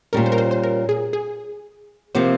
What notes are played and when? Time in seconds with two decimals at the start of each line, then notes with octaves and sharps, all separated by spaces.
0.13 A#2 G3 C#4 A#4
0.26 C5
0.32 A#4
0.38 C5
0.51 C5
0.64 A#4
0.89 G#4
1.13 G#4
2.15 C3 F3 A#3 C5